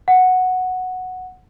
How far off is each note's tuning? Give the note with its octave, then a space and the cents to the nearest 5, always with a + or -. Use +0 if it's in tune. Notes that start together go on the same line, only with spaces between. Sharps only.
F#5 -5